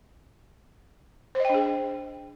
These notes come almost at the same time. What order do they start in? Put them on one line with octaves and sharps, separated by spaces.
C5 D#5 G5 D4 G#4